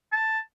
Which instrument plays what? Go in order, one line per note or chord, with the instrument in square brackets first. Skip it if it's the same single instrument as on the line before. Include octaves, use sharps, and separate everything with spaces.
[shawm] A5